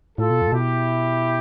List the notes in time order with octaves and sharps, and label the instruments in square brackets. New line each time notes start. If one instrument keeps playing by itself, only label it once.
[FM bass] A2 [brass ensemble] F4 A4
[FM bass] B2
F2
A2
[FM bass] B2 [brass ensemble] E4 G4